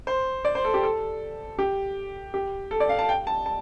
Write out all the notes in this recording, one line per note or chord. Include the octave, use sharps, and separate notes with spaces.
C5
D5
C5
A4
G4
A4
G4
G4
A4
D5
F5
A5
G5
A5
A5